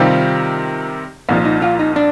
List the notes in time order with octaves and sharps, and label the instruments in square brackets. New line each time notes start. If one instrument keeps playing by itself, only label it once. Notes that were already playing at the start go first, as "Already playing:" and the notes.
Already playing: [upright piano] C3 D#3 G3 C4 G4 [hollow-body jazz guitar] F4
[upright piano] C2 A#2 F3 [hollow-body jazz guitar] D#4
[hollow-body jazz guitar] D#4
F4
D#4
D4